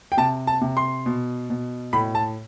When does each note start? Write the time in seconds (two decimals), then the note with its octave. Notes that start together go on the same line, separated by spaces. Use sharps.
0.12 G5
0.17 C3 A5
0.47 A5
0.61 C3
0.77 C6
1.06 B2
1.50 B2
1.93 A2 B5
2.15 A5